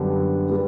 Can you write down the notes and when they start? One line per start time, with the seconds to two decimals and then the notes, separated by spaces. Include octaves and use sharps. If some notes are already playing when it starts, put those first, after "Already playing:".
Already playing: F#2 D3 G3 B3 D4
0.49 G3 B3